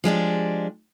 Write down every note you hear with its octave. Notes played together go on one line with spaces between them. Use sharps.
F3 G#3 D4 G4